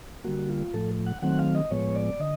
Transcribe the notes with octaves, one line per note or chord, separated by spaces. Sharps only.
D3 G3 A#3 F#4
F4
A2 F3 A3 A4
F#5
D#3 F#3 A3 C4 F#5
F5
D#5
A2 F3 G#3 B3 C#5
D5
D3 D#5